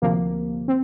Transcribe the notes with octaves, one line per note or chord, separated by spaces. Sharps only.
D2 C3 F3 A#3
C4